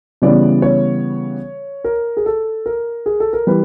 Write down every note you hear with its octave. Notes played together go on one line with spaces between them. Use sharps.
C#3 E3 G3 B3 D5
C#5
A#4
G#4
A4
A#4
G#4
A4
A#4
E3 G3 B4